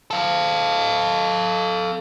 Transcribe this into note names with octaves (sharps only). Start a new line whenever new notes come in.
A4 F5